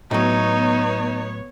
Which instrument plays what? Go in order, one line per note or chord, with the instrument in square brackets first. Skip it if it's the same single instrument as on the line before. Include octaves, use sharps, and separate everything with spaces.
[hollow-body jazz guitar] A2 F#3 [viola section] B3 C#5 [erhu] D#4